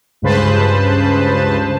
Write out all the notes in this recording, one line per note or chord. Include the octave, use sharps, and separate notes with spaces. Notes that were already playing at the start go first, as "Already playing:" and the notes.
C#2 G2 C#3 B4 C5 A5